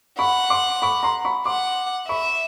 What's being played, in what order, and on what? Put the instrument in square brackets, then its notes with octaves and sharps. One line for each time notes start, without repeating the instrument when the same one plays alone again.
[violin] F#5 [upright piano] B5 C#6
[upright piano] C6 D6
B5 C#6
A#5 C6
B5 C#6
[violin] F#5 [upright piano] C6 D6
[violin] E5 [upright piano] B5 C#6